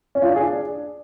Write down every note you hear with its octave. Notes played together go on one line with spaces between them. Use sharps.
C#4
F4
D4
G#4
D4